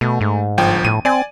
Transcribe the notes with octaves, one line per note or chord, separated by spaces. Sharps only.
B2 A3
G#2
G1 F3 G5
A2 D#7
C4 D5 G#5